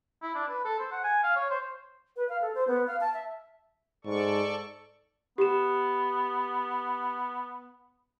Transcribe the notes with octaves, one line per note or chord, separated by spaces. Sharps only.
E4
D4
B4
A4
C5
F#5
G#5
F5
C#5
C5
B4
F5
A4
C5
B3
F5
A5
E5
G#2 A4 D5 C#6
B3 G4 E7